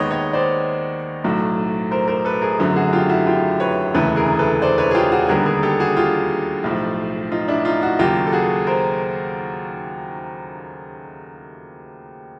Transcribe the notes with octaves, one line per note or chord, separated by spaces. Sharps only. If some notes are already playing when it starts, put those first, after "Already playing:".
Already playing: D#2 D#3 G#3 B3 C#5 D#5
C#5 D#5
C5 D5
B1 A2 F#3 A3
A#4 C5
A#4 C5
A4 B4
G#4 A#4
G#1 F#2 D3 F#3 A3
F#4 G#4
F4 G4
E4 F#4
F4 G4
B4 C#5
E1 D2 C#3 E3 A3 A4 B4
G#4 A#4
A4 B4
C5 D5
B4 C#5
G#4
F4 G4
F#4 G#4
D#2 D3 G3 B3 G#4 A#4
G#4 A#4
G4 A4
F#4 G#4
F4 G4
B1 A2 F3
D#4 F4
D4 E4
D#4 F4
E4 F#4
D#2 C#3 F#3 F4 G4
A4
F#4 G#4
A#4 C5